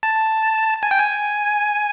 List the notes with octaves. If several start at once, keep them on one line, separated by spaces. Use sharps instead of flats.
A5
G#5
G5
G#5